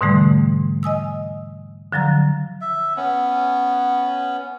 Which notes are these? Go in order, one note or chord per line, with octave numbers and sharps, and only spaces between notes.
G#2 B2 D3 E3 G3 A3
D#5 G#5 D#6 E6
D3 F3 F#3 A#5
E5
B3 C#4